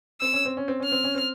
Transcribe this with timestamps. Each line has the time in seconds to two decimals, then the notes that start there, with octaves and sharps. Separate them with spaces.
0.21 C4 E6
0.33 C#4
0.45 C4
0.57 C#4
0.68 C4
0.80 C#4 F6
0.92 C4
1.04 C#4
1.15 C4